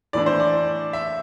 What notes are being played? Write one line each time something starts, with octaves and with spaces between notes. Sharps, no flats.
A2 E3 A3 D4 D5
C5
D5
E5